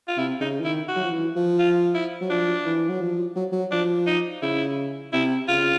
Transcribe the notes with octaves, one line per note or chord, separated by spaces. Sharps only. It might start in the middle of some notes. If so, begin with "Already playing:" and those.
F4
C3 E4
C#3 D#4
E3
D#3 E4
F#4
F#3
F3
E3
F3
F4
E4
F#3
F3 D4
E3
F#3
F3
F#3
F#3
F3 D4
D#4
C#3 E4
C3 E4
C#3 F4